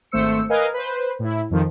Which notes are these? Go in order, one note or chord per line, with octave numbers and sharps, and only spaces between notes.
G#1 A3 C5 E6 C#7
A#4 B4 D#5 F5 G#5
B4 C5
A2 E4
F2 D#3 F3